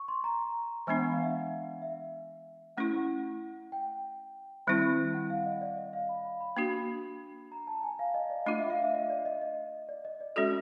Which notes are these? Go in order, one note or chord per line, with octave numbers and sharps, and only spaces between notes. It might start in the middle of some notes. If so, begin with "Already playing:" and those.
Already playing: C#6
C6
A#5
E3 G#3 B3 D4 G#5
F#5
F5
E5
E5
A3 C#4 E4 F#5
G5
D#3 G3 C4 E4
F#5
F5
D#5
D5
D#5
F5
B5
B5
B5
A#3 D4 F#4
A#5
A5
G#5
F5
D#5
D5
A3 D4 F4 D#5
E5
F5
E5
D#5
D5
D#5
D#5
D5
D#5
D5
G#3 C#4 F#4 A4 D5